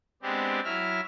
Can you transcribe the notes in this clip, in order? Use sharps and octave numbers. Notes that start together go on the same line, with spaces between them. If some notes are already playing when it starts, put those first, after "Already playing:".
G#3 B3 C4 D4 G4
F#3 E4 E5 F6